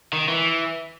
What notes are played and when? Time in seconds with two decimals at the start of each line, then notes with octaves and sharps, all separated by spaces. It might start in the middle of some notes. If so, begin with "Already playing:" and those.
0.13 D#3
0.29 E3